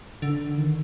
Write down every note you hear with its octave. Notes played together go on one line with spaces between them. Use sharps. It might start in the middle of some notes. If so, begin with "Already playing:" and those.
D3
D#3